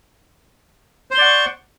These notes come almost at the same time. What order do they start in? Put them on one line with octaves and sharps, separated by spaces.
C5 C6 D5 F#5 C#6